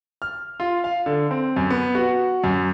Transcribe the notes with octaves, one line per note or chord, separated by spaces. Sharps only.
F6
F4
F5
D3
C4
F#2
B3
F#4
F#2